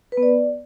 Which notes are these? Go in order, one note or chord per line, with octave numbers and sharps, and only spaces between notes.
B4
B3
D5